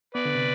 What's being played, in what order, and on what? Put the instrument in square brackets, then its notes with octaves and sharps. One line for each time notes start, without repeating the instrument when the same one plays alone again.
[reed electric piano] B3 [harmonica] B4 D5
[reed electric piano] D3
C3